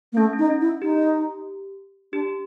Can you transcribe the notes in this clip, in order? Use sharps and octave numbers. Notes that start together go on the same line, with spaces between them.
A#3
A3 C#4
C#4
D#4
C#4
E4
D#4 G4
D4 G4